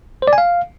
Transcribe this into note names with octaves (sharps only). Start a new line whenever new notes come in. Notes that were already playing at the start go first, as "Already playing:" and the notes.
C5
D5
G#5
F5